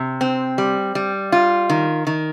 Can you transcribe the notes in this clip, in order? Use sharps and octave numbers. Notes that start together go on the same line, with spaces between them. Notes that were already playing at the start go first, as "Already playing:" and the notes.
Already playing: C3
C4
G3
G3
F4
D#3
D#3